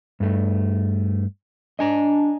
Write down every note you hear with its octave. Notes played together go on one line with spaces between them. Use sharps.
G2 A3
D4 D#5 G#5 A#5